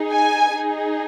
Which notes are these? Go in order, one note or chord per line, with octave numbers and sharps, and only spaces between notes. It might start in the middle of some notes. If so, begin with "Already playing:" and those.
Already playing: D#4 G#4
G#5
D#4 G#4